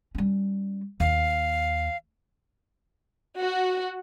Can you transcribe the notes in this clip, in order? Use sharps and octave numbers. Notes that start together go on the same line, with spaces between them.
G3 C#4
D#2 F5
F#4